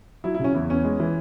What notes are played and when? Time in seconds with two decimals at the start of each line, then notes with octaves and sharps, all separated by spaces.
0.24 F#3 E4
0.34 E4
0.39 C#3 C#4
0.55 E2 E4
0.70 B3 C#4
0.85 G#3
1.00 E3